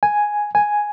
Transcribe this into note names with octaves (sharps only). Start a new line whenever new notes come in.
G#5
G#5